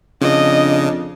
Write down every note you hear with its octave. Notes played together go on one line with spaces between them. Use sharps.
F2 C#3 D4 D#5